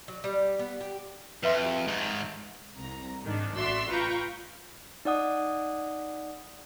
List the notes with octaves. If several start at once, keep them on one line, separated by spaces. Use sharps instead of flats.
F#3
G3
B3
G4
F2 B4 E5 C6
G4 G#4
G#2 D#3
C2 A#5
G#2 D#3 D4
A1 F#4 D5 E5 C6 E6
F4 B4 F5 G5 A#5 C#6
D#4 D5 F#5 D#6